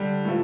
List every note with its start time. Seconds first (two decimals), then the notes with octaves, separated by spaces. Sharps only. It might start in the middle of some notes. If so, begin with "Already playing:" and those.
Already playing: D3 G3
0.25 A2 F3 A3